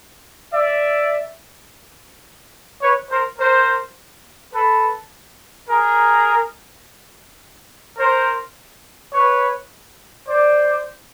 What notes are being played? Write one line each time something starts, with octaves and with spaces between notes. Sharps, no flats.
D5 E5
B4 C#5
A#4 C5
A#4 C5
A4 B4
G#4 A#4
A#4 C5
B4 C#5
C5 D5